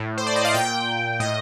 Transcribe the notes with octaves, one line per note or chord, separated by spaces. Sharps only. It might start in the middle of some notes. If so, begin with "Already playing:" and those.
Already playing: A2
C5
D5
D#5
F5
A#2 G5
A2 D#5